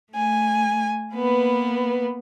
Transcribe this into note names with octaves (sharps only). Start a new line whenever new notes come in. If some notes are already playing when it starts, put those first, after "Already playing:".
A3 G#5
A#3 B3 B4